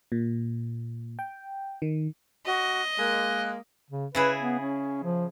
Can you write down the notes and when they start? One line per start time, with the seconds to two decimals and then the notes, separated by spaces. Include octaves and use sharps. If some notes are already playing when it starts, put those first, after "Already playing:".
0.12 A#2
1.19 G5
1.82 D#3
2.46 F#4 D#5
2.99 G#3 A#3 F#6
3.90 C#3
4.15 C#3 E4 G#4 B4
4.41 B3
4.60 C#4
5.04 F3